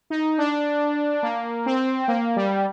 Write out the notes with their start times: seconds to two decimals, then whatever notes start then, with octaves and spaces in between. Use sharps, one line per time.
0.10 D#4
0.38 D4
1.23 A#3
1.66 C4
2.08 A#3
2.36 G3